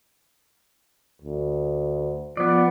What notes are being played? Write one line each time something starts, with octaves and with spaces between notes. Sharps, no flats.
D2
F3 B3 D5